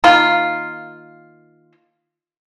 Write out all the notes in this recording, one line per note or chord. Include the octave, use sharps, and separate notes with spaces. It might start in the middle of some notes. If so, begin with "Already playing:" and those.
D#3 A#3 F4